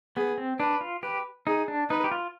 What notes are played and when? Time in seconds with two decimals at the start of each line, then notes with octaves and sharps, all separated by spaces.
0.17 B3 G#4
0.38 C4
0.60 D4 B4
0.81 F4
1.03 G4 B4
1.47 D#4 G#4
1.68 D4
1.90 D#4 B4
2.04 G4
2.11 F4